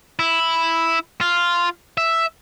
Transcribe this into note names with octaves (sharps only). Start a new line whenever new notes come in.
E4
F4
E5